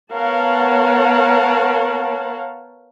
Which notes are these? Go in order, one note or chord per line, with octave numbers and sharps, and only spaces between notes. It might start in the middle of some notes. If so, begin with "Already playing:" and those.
B3 A#4 C#5 F5 F#5 A5